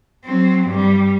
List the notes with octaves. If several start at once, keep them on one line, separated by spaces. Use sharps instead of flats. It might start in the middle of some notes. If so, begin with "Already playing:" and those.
F#3 C4
G2 G3